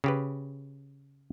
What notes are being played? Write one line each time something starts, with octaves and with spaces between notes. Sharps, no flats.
C#3 G4 B4